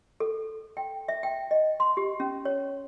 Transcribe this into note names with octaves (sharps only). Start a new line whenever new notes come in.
A4
G5
E5
G5
D#5
C6
G4
C#4
C#5